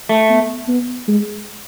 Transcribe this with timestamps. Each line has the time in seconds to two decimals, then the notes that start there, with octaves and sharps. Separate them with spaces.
0.09 A3
0.30 B3
0.68 B3
1.08 G#3